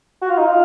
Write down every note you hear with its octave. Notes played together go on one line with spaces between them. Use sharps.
F#4
F4
D#4
F4